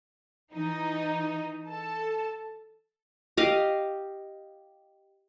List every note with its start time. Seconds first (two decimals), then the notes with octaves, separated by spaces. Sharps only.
0.52 E3 D#4
1.68 A4 A5
3.37 G4 D#5 F5